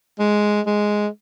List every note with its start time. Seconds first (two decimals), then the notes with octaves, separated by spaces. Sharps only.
0.19 G#3
0.66 G#3